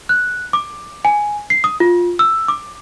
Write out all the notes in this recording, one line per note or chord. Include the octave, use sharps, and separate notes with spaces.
F#6
D6
G#5
C7
D#6
F4
E6
D6